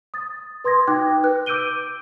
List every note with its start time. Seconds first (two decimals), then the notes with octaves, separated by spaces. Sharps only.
0.14 D#6 A6
0.64 B4 C6 D#6 G#6 A#6
0.87 D#4 F#4 G5 D6 F#6 G#6
1.24 B4 F#6
1.46 D6 E6 G6 D7 D#7 G7